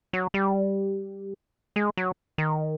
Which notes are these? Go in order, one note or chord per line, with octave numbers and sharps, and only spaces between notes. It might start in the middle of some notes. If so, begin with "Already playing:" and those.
F#3
G3
G#3
F#3
D#3